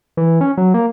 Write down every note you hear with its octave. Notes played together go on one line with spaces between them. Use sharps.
E3
C#4
F#3
A#3